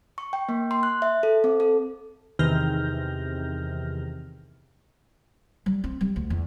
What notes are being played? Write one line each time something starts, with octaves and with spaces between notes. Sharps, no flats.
C#6
G5
A#3
C6
F#6
E5
A4
C4
A4
E2 C3 D#3 F6 G6 A#6
G3
C4
G3
D2
E2